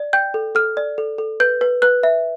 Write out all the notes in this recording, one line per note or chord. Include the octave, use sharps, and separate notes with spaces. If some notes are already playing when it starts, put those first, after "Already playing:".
Already playing: D5
G5 G6
A4
A4 F6
D5
A4
A4
B4 G6
B4
B4 F#6
E5